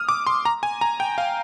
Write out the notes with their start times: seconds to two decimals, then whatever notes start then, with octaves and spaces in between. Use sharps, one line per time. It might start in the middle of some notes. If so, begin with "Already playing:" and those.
Already playing: D#6 F6
0.09 D6
0.27 C6
0.45 A#5
0.63 G#5
0.81 A#5
1.00 G5
1.18 F5